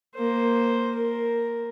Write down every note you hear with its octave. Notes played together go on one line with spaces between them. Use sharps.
A#3 C5
A#4